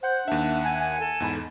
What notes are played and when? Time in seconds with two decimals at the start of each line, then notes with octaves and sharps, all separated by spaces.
0.03 C5 F#5
0.28 D#2 D4 E5
0.65 G#5
0.80 G#5
1.00 A4
1.20 E2 G#2 B5